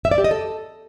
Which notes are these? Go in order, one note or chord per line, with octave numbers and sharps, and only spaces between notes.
E5
D5
G4
D#5
A4